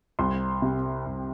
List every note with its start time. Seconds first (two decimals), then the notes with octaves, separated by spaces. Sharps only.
0.19 C2 C6
0.62 C3
1.06 C2